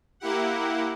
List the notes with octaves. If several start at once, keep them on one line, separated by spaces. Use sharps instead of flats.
A#3 E4 G4 F#5